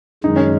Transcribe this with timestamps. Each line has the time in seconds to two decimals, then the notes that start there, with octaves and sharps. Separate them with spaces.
0.24 F#2 D#3 G#3 D#4
0.36 C#4